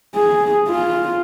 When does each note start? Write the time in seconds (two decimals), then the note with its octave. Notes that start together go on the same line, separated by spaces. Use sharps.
0.15 G#4
0.69 F4